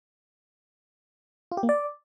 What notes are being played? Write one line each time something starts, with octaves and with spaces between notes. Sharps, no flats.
F4
G4
A#3
D5